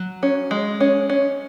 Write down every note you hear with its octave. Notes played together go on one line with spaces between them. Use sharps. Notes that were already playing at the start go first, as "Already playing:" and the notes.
Already playing: F#3
C#4
G#3
C#4
C#4